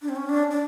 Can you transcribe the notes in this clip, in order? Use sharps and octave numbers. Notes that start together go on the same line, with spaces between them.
D4
C4
C#4
D4
D4